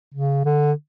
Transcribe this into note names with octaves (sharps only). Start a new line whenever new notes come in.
C#3
D3